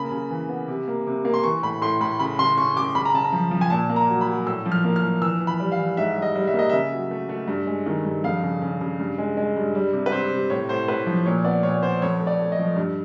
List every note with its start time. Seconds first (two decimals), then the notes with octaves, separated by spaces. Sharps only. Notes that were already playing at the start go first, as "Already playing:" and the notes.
Already playing: C#3 A#3 B5
0.12 C#3
0.30 E3
0.49 B3
0.68 C3
0.88 A#3
1.07 C3
1.25 A#3
1.34 C6
1.43 E3 C#6
1.63 A2 B5
1.82 A2 C6
2.01 A2 B5
2.19 C#3 B5
2.39 C#3 C6
2.57 C#3 C#6
2.76 C#3 D6
2.95 C#3 B5
3.05 A#5
3.14 C#3 A5
3.24 A#5
3.33 F3
3.51 F3
3.61 G#5
3.70 A#2 A5
3.90 A#3
3.96 A#5
4.09 F#3
4.21 B5
4.27 F#3
4.47 A2 E6
4.66 F3
4.72 F6
4.84 A#3
4.96 F6
5.02 F3
5.22 E3 E6
5.40 E3
5.47 B5
5.60 G3
5.72 F5
5.78 E3
5.97 G#2 E5
6.17 G3
6.22 D#5
6.35 G3
6.47 E5
6.54 A#3 D#5
6.70 C#3 E5
6.92 F#3
7.11 A3
7.29 A3
7.48 G2
7.67 G#3
7.86 D#3
8.05 G2
8.24 F2 F5
8.43 C#3
8.62 C#3
8.81 C#3
8.99 G2
9.18 G#3
9.37 G#3
9.56 G2
9.75 G3
9.93 C3
10.06 B4
10.12 C3 C5
10.32 C3
10.50 A2 C#5
10.69 A2 C5
10.88 A2 B4
11.06 F3
11.26 A#2 C#5
11.45 B3 D5
11.63 A#2 C#5
11.74 C#5
11.82 B3 C5
12.02 F2 C#5
12.20 A3
12.27 D5
12.39 A3
12.52 D#5
12.58 F3
12.76 G2